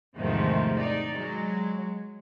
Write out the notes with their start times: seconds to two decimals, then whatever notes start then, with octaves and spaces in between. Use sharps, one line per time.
0.16 E2 G#2 C3 D#3 F3 A3
0.79 D#4 D5
1.15 F#3 G#3